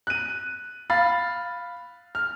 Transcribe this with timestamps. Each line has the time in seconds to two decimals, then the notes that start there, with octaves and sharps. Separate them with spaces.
0.07 F#6 D#7
0.90 F5 B5 A6
2.15 F6